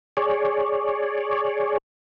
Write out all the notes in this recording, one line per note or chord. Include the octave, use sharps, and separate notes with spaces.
G#4 C#5 D5